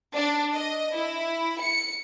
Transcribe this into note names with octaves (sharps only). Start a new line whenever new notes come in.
D4
D#5
E4
C#7